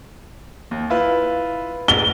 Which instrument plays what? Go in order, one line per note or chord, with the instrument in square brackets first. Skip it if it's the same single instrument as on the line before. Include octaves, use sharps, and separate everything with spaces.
[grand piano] D#2
E4 F4 B4
[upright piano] G7